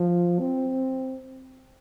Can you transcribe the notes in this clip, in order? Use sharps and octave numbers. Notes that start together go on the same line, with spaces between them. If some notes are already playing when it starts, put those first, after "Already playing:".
Already playing: F3
C4